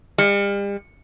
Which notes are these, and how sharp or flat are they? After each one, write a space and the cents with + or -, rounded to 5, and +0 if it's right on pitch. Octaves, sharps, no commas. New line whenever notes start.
G3 +40